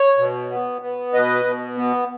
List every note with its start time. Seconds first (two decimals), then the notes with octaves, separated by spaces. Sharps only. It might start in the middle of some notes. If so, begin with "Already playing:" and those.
Already playing: C#5
0.18 B2
0.51 B3
0.82 B3
1.13 B2 B4 D#5
1.45 B2
1.77 B3